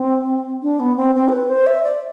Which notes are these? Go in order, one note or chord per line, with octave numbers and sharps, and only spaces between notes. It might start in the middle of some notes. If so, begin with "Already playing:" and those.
Already playing: C4
D4
B3
C4
C4
C5
B4
C5
E5
D5